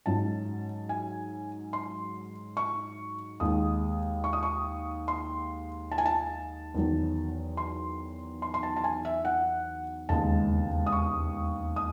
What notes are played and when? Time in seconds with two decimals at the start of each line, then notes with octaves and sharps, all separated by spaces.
0.06 G#2 F#3 C#4 A5
0.89 G#5
1.73 C6
2.57 C#6
3.40 D#2 D#3 G#3 D#6
4.24 C#6
4.33 D#6
4.43 C#6
5.08 C6
5.92 A5
5.98 G#5
6.06 A5
6.74 E2 D#3 F#3
7.57 C6
8.42 C6
8.54 C6
8.63 A5
8.77 A5
8.84 G#5
9.05 E5
9.25 F#5
10.09 E1 D#2 C#3 G#3 A5
10.86 D#6
10.93 C#6
11.76 D#6